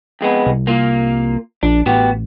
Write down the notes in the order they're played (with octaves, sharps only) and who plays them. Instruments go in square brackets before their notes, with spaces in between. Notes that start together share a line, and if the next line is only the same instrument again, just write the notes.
[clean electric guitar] F2 G#3 B3
[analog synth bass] C2
[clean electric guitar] A#3 F4
[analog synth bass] A#1 [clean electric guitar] D4
[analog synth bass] A1 [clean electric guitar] B3 F#4 G4